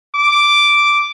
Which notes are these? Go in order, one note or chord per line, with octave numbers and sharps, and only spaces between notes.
D6